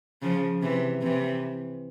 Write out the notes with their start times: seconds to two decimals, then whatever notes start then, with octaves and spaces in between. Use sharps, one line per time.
0.22 C#3 F3
0.62 C3 E3
1.02 C3 E3